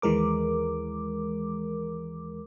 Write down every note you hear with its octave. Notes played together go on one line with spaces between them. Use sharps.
D#2 E3 G#3 A#4 D6